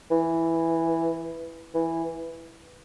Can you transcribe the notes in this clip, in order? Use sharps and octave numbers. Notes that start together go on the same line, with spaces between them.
E3
E3